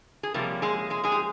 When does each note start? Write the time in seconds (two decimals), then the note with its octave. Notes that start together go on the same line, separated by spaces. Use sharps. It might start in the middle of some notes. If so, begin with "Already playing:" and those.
0.23 G#4
0.34 C3 F3 G3 A#3 C#4 G4
0.62 G#3 G#4
0.90 G#3 G#4
1.04 G#3 G#4
1.12 G4